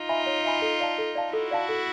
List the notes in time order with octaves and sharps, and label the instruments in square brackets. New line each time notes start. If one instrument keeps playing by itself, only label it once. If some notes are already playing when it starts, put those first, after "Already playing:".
Already playing: [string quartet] D#4 F4
[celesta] E5 G#5 B5
C#5
E5 G#5 B5
A4
D5 F5 A5
A4
D5 F5 A5
[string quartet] E4 F#4 [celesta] A4
[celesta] D5 F5 A5
A4